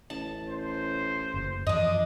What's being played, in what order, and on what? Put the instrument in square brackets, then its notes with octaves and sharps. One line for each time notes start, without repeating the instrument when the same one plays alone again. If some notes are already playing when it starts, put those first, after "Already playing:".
[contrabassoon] A1 [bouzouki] A5
[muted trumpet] C5
[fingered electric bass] F#1
[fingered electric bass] F#2 E3 F3 [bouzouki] D4 D#5